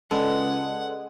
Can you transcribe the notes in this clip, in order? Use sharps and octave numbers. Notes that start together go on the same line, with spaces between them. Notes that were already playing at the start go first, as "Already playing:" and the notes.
C#2 G#3 A4 B4 D5 F#5